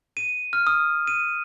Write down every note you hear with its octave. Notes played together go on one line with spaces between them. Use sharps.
D#7
F6
D#6
D#7